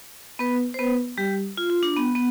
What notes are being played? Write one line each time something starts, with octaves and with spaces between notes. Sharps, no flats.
B3 B4
C5
B3 B4
G3 G4
F4
F4
D4
B3
B3